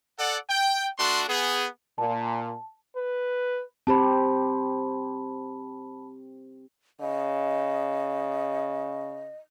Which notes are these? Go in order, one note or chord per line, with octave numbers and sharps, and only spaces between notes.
A4 D5 F#5
G5
A3 D4 F#4 C6
B3 G#4
A#2 A5
B4
C4 G4 C5 A5 B5
C#3 D#5